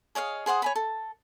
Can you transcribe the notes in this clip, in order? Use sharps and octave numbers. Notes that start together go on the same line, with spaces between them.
G#4 C#5 D#5 F5
G#4 C5 F#5 D#6
C#5 G#5 B5
A4